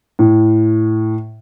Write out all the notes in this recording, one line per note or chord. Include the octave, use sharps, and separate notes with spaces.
A2